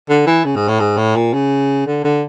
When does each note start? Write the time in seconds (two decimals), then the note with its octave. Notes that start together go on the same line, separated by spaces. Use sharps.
0.10 D3
0.27 E3
0.45 C#3
0.56 G#2
0.68 A2
0.80 G#2
0.97 A2
1.16 A#2
1.34 C#3
1.87 D3
2.04 D3